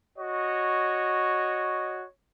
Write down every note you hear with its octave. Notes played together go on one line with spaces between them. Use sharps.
F#4 C#5 D#5